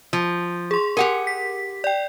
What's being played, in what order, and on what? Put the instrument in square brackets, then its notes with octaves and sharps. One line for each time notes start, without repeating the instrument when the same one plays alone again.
[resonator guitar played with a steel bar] F3
[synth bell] G#4 C6
[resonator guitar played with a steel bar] G4 F#5 G#5 [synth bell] A#4
[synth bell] B6
D5 G5